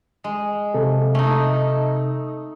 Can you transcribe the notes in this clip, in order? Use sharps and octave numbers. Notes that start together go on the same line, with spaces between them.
G#3
C3 A4
A3 D#4